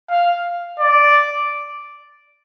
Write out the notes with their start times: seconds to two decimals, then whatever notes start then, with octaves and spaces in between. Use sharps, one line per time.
0.10 F5
0.79 D5